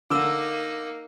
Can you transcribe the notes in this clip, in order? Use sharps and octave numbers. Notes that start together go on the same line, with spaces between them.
D3 A#3 D#4 D6 E6